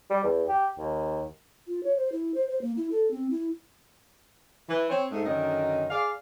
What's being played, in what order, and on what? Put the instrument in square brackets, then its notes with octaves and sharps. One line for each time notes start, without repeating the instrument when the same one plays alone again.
[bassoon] G3
E2
G4
D#2
[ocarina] F4
C#5
C5
E4
C5
C5
A#3
E4
A4
C4
E4
[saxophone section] E3
C4 C5 C#5
G#2 A3
F#2 D3 D#3 D#5
G#4 D5 F5